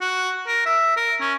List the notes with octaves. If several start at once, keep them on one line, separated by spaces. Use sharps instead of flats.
F#4
A#4
E5
A#4
C#4